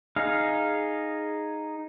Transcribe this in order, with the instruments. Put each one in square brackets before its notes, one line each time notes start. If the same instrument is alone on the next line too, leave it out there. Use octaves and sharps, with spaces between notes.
[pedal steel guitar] D#4 G#4 F5